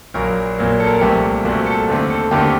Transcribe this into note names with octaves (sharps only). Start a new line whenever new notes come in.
A#1 A#2 F#3 A#3 A#4
A#1 A#2 F#3 A#3
A4
A#4
A4
C2 A#2 A3 C4 G4
C2 A#2 A3 C4 F#4
A4
D#2 D3 A3 C4
A4
D#2 D3 A3 C4 G4